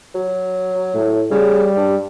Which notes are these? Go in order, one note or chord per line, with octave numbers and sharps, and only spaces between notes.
F#3
A2
C#3 G3
G2